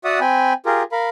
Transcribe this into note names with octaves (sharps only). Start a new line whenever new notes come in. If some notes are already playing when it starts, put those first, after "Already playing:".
F#4 D5 E5 F#5 D#6
C4 G5 G#5 B5
F4 G4 G#4 A#4
A#4 F5 B5